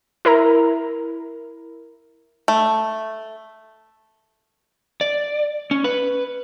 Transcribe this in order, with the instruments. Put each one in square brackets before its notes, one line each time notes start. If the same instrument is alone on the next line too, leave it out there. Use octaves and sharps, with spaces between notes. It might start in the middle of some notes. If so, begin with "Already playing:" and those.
[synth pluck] E4 A#4 A#5
[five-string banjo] A3
[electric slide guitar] D5
C#4
B4